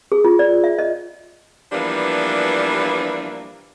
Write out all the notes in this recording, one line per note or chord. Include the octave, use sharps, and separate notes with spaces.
G#4
F4
D5
E5
D#5
E3 F3 G3 A#3 B3 D4